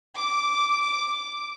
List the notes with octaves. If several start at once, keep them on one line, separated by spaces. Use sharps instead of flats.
D6